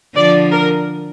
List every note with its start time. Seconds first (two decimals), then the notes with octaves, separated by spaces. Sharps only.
0.15 D3 F3 D5
0.52 A#4